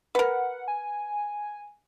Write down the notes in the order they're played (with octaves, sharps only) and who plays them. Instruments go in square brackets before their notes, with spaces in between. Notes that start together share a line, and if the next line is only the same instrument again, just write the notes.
[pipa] A#4 B4 [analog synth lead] F#5
[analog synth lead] G#5